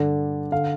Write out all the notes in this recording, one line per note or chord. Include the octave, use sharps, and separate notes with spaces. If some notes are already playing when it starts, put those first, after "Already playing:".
Already playing: G2 D3 D5
D3 F5